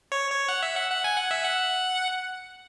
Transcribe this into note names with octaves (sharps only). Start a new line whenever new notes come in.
C#5
C#5
F#5
E5
F#5
F#5
G#5
F#5
E5
F#5